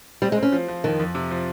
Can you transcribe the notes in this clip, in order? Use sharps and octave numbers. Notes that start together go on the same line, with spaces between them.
G3 C4
G#3
C4
C#4
F3
F3
F2 D#3
F2
C3
F3